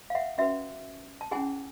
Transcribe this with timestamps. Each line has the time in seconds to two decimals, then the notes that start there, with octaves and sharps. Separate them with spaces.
0.10 F5
0.15 E5 F#5
0.38 C#4 F#4 B4 E5 F#5
1.21 A5
1.31 C#4 E4 G#4 F#5 G#5